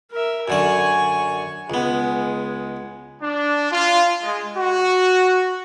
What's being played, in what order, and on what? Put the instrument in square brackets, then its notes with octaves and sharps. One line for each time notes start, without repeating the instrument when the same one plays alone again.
[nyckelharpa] A#4 E5
[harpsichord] F#2 D3 D5 [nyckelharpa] G#5 C#6
[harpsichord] C#2 B3 [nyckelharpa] G#3
[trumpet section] D4
F4
G#3
F#4